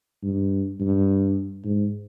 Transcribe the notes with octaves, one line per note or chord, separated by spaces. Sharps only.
G2
G2
G#2